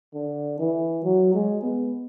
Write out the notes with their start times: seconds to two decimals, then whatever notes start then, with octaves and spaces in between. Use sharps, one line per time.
0.14 D3
0.59 E3
1.04 F#3
1.34 G#3
1.63 B3